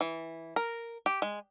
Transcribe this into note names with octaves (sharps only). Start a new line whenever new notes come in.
E3
A#4
G4
G#3